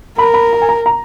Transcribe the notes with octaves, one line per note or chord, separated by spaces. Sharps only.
A#4 B5
B5
A#5
G#5
A#5
A#5